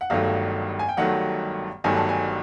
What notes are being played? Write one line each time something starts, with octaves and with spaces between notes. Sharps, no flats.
F#5
G1 G2 D#3 F#3 A3 F5
G#5
G5
G1 G2 D#3 F#3 A3 F#5
G1 G2 D#3 F#3 A3 G#5
A5
G#5